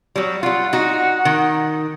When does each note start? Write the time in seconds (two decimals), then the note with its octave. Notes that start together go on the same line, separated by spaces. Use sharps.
0.16 F#3 G3
0.43 G3 F4 F#5
0.73 D#4 F#4
1.25 D#3